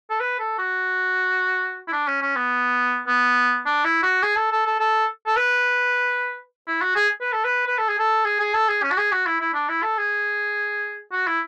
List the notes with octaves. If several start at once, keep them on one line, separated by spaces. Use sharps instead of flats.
A4
B4
A4
F#4
E4
D4
C#4
C#4
B3
B3
D4
E4
F#4
G#4
A4
A4
A4
A4
A4
B4
E4
F#4
G#4
B4
A4
B4
B4
A4
G#4
A4
G#4
G#4
A4
G#4
C#4
F#4
G#4
F#4
E4
E4
D4
E4
A4
G#4
F#4
E4